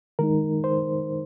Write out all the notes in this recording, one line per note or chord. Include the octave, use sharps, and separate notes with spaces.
D#3 G#3 D#4 A#4
C5